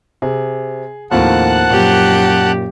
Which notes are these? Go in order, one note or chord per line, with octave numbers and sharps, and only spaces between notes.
C3 G#4
D#2 A2 F3 A#3 C4 F#5 A5 F#6
F#2 A#2 G4